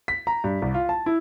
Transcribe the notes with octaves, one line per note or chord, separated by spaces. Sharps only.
B6
A#5
G2
C2
F4
A5
E4